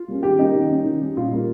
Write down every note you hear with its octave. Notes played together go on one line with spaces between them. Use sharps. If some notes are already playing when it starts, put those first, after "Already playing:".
Already playing: F4
G3 A#3 C#4
D#3 G4
G3 A#3 C#4 D#4
D#3
G3 C#4
D#3
G3 C#4
A#2 F4
G3 A#3